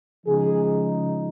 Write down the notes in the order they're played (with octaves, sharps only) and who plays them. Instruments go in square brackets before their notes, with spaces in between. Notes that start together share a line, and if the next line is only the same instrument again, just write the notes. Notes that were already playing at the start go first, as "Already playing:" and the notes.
[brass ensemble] C#3 F3 G#3 D#4 G#4